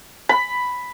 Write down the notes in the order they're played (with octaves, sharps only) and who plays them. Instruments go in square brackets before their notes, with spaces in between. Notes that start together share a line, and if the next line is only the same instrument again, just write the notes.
[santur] B5